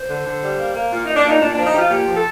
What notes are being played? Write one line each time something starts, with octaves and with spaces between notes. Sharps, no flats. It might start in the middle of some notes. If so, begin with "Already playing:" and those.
Already playing: C5
D3
D3
G3
A#3
A#3
A#2 F4
A#2 D#4
D4
A#2 D#4
A#2 D4
F3 D4
D#4
F3 F4 G4
A#2 G4
F3
A4